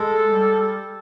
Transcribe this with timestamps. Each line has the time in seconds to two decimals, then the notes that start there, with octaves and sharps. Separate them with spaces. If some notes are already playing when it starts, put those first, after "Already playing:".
Already playing: G#3 A4
0.31 G3